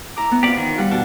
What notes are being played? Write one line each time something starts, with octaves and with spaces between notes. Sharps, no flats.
E4 A#5 D6
B3
C4 F4 G4 D5
D#3
G3 F4 F#5
B2 D4